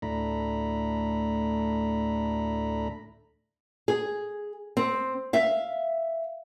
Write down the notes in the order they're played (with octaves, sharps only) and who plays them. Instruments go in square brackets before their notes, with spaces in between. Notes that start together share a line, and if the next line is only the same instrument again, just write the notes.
[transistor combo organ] D2 A2 A3 D4 A#5 B5
[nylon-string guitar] G#4
C4
E5 F5